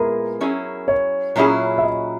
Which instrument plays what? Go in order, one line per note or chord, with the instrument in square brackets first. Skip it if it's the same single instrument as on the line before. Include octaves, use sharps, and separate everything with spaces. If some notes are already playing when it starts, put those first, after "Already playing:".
Already playing: [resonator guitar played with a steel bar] A#2 G#3 B3 E4 G#4 [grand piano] A#4
[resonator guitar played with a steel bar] F#3 C#4 E4 G#4
[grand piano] C#5
[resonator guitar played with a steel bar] A#2 F#3 C#4 E4 G#4
[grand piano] E5
D#5